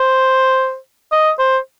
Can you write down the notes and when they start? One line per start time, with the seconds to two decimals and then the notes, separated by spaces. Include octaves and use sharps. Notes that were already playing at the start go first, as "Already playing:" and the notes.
Already playing: C5
1.12 D#5
1.39 C5